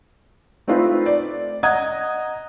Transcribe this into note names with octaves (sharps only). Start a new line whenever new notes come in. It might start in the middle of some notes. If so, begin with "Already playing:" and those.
A3 C4 D#4 F4 B4
D5
D#5 F#5 A#5 D#6 G#6